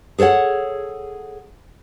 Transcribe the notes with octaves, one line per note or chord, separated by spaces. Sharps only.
G#4 A4 C5 C#5 F#5